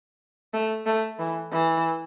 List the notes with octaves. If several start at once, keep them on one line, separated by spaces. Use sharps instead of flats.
A3
A3
E3
E3